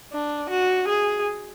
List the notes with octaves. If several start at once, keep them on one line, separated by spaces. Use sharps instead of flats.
D4
F#4
G#4